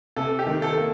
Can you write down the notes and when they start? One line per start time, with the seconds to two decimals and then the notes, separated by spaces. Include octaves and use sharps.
0.16 C3 A4
0.39 G4
0.47 D#3
0.62 A4
0.78 A#3